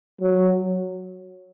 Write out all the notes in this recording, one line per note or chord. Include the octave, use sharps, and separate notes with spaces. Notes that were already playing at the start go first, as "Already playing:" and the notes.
F#3